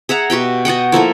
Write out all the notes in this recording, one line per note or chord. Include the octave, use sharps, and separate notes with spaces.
G#4 E5 F#5 A#5
B2 F#4 G4 G5
F#4 D#5 F#5 G5
F3 A#3 E4 A4